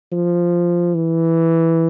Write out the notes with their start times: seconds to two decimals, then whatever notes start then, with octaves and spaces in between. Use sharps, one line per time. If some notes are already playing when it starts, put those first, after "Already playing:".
0.12 F3
0.95 E3